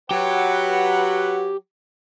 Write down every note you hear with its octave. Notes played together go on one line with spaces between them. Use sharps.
F#3 G4 B4 F#5